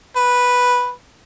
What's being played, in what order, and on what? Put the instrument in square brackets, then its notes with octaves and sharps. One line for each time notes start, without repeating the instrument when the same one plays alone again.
[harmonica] B4